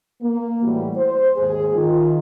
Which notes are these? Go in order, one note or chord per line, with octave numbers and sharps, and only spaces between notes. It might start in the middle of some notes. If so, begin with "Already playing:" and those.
A#3
A2 E3 G3 F#4
C5
D#2 G#2 G#4
D#3 F4